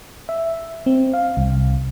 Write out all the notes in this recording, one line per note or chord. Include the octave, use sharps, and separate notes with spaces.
E5
C4
F5
C2